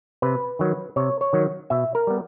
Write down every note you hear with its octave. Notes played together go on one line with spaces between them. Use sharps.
C3 B4
D#3 F#3
C3 C#5
C#5
D#3 F#3
B2 E5
A#4
G3 B3